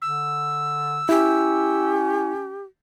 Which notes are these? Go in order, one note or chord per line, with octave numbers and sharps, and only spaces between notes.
D3 E6
C#4 E4 G4